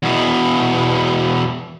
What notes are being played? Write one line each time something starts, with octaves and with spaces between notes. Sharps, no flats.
E2 B2